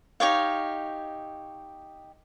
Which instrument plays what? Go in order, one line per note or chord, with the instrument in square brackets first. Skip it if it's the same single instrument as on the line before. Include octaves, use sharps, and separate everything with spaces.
[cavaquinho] D#4 G4 C#5 F5